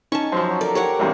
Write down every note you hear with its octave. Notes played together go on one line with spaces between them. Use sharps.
C#4 D#4 A5 C#6
F#2 F3 C5
F#3
A4 A#4 D5
G4 C#5 D5 F#5
E2 G2 C3